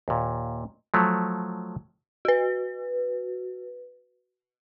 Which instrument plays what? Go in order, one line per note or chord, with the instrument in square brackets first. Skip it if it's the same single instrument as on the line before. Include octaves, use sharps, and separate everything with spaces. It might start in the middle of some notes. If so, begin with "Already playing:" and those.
[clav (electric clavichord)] D#2 A#2
F3 F#3 A3
[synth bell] F#4 B4